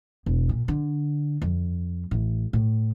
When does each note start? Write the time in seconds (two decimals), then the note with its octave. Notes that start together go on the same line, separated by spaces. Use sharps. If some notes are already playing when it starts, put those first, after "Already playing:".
0.26 E1
0.49 A#2
0.68 D3
1.42 F2
2.11 A1
2.53 A2